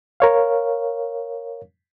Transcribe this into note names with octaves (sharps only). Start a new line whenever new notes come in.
A#4 C#5 F5